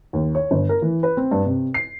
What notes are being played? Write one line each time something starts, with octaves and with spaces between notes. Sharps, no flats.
D#2
C#5
G1
A#4
E3
B4
C4
G2
C3
C7